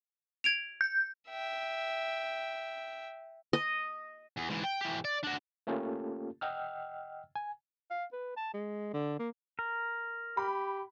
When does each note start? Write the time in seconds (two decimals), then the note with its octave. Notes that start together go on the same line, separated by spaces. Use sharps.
0.44 G#6 D7 F7
0.81 G6
1.29 E5 G5
3.53 D#5
4.37 E2
4.50 G#2 E3
4.64 G5
4.81 E3 G4
5.05 D5
5.23 D4 F#4
5.67 A3 A#3 C#4 F4 G4 A4
6.41 D#5 F#5 G5 E6 F6
7.36 G#5
7.91 F5
8.13 B4
8.37 A5
8.54 G#3
8.94 D3
9.19 A#3
9.59 A#4
10.37 G4 B5